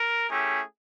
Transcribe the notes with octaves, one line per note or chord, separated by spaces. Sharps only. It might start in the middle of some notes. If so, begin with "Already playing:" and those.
Already playing: A#4
A3 C#4 E4 G4 G#4